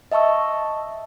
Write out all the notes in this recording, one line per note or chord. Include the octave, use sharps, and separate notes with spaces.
D#5 E5 A5 C#6 E6